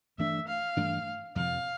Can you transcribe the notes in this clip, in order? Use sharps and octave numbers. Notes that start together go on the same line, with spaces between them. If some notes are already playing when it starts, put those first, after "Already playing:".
G2 E3 A3 D4 E5
F5
G2 E3 A3 D4
F2 C3 F3 F5